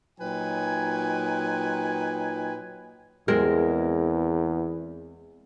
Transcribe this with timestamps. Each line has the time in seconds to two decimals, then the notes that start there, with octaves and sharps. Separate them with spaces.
0.20 A#2 F#3 D#4 B4 G5 G#5
3.28 E2 G#3 C4 A#4